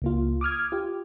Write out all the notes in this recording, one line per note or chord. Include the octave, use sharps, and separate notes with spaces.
C#2 A#3 F4
D6 D#6 F6 G#6
F4 G4